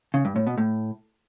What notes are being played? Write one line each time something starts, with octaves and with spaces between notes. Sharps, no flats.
C#3
G2
A2
B2
A2